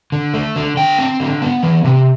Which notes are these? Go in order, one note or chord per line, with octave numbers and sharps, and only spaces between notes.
D3
A3
D3
D3 G5
C4
D3
B3
E3
C3